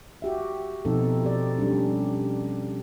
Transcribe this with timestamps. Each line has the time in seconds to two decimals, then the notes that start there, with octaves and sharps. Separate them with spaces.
0.22 F#4 G4 E5
0.85 B2 F3 C4 D#4 A4
1.24 G4 A4 D5
1.58 G3 C#4 D4